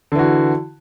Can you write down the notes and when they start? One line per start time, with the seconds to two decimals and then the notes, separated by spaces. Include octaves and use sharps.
0.12 D3
0.15 E3
0.19 F#4